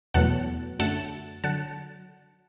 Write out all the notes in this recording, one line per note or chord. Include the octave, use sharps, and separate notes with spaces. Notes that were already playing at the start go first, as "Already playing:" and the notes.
E2 B2 F#3 A3 F#5 A5
F#2 D3 A3 F#5 A5
D3 F#3 F#5 A5